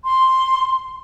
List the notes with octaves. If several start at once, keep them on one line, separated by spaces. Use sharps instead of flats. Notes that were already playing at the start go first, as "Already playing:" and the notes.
C6